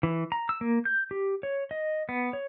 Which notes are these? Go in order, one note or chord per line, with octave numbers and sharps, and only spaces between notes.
E3
A#5
E6
A#3
G6
G4
C#5
D#5
B3
C#5